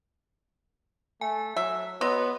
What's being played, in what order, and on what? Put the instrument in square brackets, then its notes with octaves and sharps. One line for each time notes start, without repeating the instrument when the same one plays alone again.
[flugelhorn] A3 [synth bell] G#5
[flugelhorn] F#3 [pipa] E5
[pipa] F#3 [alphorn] B3 [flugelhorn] D#5 [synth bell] C6